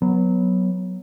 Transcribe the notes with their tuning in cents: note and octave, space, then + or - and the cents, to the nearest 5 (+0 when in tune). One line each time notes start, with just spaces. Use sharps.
F#3 +0 B3 -5